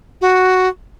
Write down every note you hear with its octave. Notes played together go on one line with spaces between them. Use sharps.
F#4